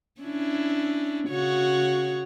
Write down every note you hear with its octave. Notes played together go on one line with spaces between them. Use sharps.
C#4 D4 E4
C#3 F#4 C#5